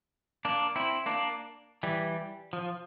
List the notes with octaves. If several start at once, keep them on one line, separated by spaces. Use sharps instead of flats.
A#3 D4
C4 E4
A#3 D4
E3 G3
F3